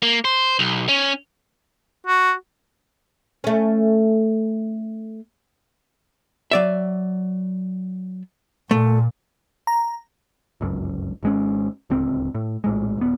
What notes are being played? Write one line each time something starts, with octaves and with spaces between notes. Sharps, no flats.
A#3
C5
B1
C#4
F#4
A3 C#4
F#3 D5 E5
A#2 A3
A#5
G1 C#2 F#2
G#1 G#3 C#4
D1 C#2 C4
A2
A#1 A2 G#3
D#1 B3